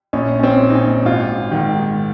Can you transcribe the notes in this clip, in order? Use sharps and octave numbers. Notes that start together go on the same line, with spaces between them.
A#1 C#4
C#4
C4
A#2
D#4
C#4
G#1 F4
G#2 D#3